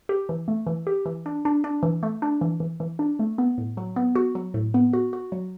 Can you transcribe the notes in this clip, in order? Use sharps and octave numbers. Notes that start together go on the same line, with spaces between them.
G4
E3
A3
E3
G4
E3
D4
D4
D4
E3
A3
D4
E3
E3
E3
D4
A3
B3
A2
F#3
B3
F#4
F#3
A2
B3
F#4
F#4
F#3